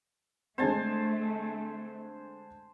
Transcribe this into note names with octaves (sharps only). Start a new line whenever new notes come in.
D3 G#3 A3 C4 C5 G#5 A5